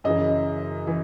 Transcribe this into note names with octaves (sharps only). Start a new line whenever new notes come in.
F#2 C#3 E3 D#5
E3